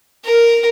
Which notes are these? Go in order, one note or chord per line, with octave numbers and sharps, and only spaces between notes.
A#4